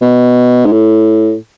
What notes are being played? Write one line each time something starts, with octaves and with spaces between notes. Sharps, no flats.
B2
G#2
A2